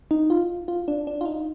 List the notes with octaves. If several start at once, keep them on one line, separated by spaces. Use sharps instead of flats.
D#4
F4
F4
D4
D4
F4
D#4